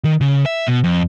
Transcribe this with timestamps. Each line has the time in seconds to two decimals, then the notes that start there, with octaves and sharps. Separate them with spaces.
0.04 D#3
0.21 C#3
0.46 E5
0.68 B2
0.84 F2